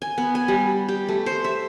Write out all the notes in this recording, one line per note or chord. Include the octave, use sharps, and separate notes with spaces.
G#5
B3
G#5
G3
G4
A3
C5
E5